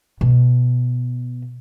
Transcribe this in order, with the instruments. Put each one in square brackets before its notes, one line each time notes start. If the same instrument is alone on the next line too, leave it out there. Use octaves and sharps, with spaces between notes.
[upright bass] B2